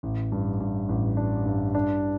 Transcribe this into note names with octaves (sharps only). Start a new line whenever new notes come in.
A1
G2
G2
A1
D4
G2
D4